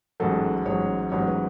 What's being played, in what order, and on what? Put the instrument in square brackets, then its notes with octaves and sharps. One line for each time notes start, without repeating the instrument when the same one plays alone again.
[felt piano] A1 G#2 F#3 A4
A1 G#2 F#3 C#5
A1 G#2 F#3 C#5
C#5
B4